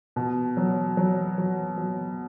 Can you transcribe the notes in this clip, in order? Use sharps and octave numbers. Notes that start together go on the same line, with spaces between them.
B2
F#3
F#3
F#3
F#3